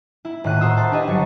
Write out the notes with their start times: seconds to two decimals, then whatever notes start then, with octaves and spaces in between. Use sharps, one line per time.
0.25 E4
0.44 D#1 A2 F#6 D#7
0.61 F#4 A#4 C5 A#5 D#6 E6
0.77 C5 A5 B5
0.92 D4 G4 B4 D#5 G#5
1.07 G1 F#3 C#6 C#7